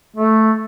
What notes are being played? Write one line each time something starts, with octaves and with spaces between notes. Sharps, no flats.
A3